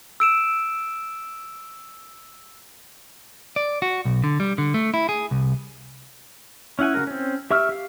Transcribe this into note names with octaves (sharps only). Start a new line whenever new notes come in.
E6 D7 E7
D5
F#4
B1
D3
G3
D3
A3
E4
G#4
C2
C#4 E4 F#5 G#5
C#3 A3 F#4 A#4
C4 C#4
G4 E5 C#6 E6 F6
G4 F5